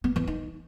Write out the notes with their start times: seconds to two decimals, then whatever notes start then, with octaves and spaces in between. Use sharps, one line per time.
0.04 B3
0.16 E3
0.27 D#4